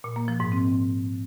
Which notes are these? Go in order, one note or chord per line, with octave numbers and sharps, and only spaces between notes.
A#2
A#3
F3
G#2
C4